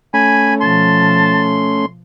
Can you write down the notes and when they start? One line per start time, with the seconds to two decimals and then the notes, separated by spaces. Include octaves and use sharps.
0.14 A3 C#4 G#5 B5
0.61 B2 F3 A5 C6